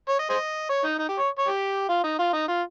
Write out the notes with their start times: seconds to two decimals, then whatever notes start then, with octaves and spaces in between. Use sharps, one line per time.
0.09 C#5
0.19 D#5
0.30 G#4 C5 D#5
0.69 C#5
0.84 D#4
0.99 D#4
1.08 G4
1.19 C#5
1.39 C#5
1.48 G4
1.89 F4
2.04 D#4
2.19 F4
2.33 D#4
2.48 F4